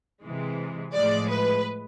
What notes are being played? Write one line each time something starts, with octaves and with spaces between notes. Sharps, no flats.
C3 E3 G#3
A2 F3 G#3 D5
B4